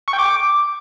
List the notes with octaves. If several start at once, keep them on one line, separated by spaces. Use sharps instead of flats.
C#6
G5
D6